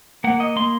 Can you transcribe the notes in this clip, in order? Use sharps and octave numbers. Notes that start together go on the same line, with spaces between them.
A#3 F#5
D#5
A#3 C6